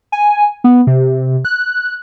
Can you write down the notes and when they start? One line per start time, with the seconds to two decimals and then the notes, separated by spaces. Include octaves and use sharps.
0.12 G#5
0.64 B3
0.87 C3
1.45 F#6